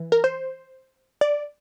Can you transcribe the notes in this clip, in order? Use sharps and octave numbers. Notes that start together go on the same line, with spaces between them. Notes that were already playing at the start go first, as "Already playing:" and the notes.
Already playing: E3
A#4
C5
D5